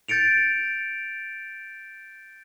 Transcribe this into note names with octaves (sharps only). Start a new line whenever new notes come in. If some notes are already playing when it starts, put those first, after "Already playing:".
G6 A6 C#7 D7 F7